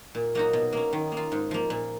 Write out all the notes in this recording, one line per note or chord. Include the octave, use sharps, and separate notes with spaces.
A#2
F#3 A#3 D#4 F#4
B2
A#3 C#4
D#3
A#3
F4
G#2
F3 A#3
A#2